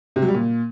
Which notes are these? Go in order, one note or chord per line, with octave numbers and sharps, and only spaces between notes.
C3
F#3
G3
A#2